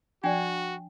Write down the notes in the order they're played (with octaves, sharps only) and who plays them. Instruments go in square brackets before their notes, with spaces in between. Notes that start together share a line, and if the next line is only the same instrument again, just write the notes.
[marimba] F3 D5 [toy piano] D4 G5 [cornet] F#4